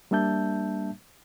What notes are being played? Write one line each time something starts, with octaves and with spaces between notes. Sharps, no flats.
G3 A#3 D4 E5 A5 G6